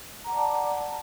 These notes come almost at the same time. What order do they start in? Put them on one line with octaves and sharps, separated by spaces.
A#5 F#5 D6 D5 A5